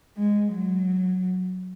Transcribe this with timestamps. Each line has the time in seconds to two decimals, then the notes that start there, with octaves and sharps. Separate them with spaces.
0.17 G#3
0.53 F#3